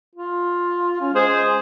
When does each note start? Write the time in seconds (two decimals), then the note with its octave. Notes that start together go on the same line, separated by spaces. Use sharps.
0.16 F4
1.01 C#4
1.14 G#3 G#4 C5